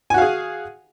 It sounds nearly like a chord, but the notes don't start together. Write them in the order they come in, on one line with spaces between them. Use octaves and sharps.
G#5 F#4 F5 G#4